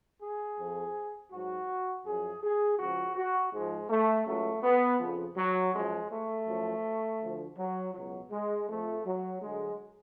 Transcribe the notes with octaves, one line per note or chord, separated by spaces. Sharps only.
G#4
F2 F3
G#2 F#3 F#4
F#2 F3 G#4
G#4
C#2 C#3 F3 F#4
F#4
G#2 F3 G#3
A3
C#2 C#3 F#3 A3
B3
F2 C#3 F3
F#3
F#2 F3 G#3
A3
F#2 F3
D2 D3 F3
F#3
C#2 B2 F#3
G#3
F2 F3 A3
F#3
D2 D3 F#3 G#3